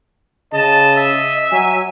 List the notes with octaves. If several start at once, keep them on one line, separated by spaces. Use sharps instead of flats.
C#3 D#5 A5
E5
F#3 G#5